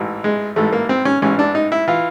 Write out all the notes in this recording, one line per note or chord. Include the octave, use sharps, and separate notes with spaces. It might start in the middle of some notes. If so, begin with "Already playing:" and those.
Already playing: A1 G#2 E3
G#3
A1 G#2 E3 A3
A#3
C4
C#4
A1 G#2 E3 C#4
D4
D#4
E4
E3 F4